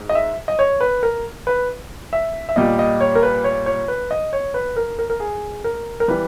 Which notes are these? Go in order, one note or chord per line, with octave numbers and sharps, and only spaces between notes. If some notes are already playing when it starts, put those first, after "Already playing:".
Already playing: G#2
D#5
E5
D#5
C#5
B4
A#4
B4
E5
E5
A#2 G3 D#5
D#5
C#5
A#4
B4
C#5
C#5
B4
D#5
C#5
B4
A#4
A#4
A#4
G#4
A#4
A#4
E3 G3 B4